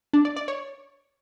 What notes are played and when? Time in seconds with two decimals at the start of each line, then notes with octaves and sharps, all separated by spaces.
0.13 D4
0.25 D5
0.36 D5
0.48 C#5